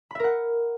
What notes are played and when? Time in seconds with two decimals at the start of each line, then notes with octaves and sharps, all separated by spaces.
0.11 B5
0.15 E5
0.20 A#4
0.24 F#5